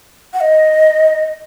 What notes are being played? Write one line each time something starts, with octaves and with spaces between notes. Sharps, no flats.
F#5
D#5